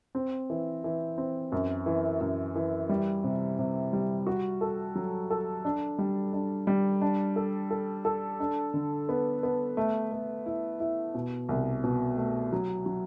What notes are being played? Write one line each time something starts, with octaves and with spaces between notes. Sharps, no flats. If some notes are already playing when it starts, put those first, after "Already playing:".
C4
E3
E3
C4
F#2
E3
F#2
E3
G3
C3
C3
G3
F#4
A4
F#3
A4
D4
G3
D4
G3
D4
A4
A4
A4
D4
D3
B3
B3
A3
A3
E4
E4
B2
C2
B2
A3
F#3
F#3